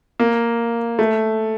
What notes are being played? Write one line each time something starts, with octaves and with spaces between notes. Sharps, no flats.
A#3
A3